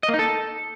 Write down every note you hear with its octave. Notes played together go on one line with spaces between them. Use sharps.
D#5
A#3
D#4
A4